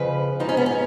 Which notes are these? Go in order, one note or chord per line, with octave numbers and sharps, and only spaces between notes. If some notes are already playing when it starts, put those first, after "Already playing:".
Already playing: F2 C#3 F3 B4
G#2 F3 D#4
C#4
B3
C#4